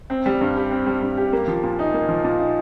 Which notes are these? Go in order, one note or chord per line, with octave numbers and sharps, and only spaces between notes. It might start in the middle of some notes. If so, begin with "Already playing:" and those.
C4
G3
G2
G4
C4
G3
G2
G4
A#3
F3
A#2
D#4
A#3
F3
A#2
D#4